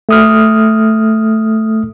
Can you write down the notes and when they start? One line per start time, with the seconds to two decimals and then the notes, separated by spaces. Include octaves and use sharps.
0.09 A3 D#6 F6